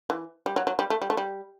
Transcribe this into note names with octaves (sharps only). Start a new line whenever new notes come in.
E3
G3
F#3
F#3
G3
A3
G3
A3
G3